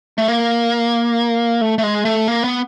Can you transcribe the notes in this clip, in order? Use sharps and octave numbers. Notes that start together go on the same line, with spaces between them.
A3
A#3
A3
A3
G#3
A3
A#3
B3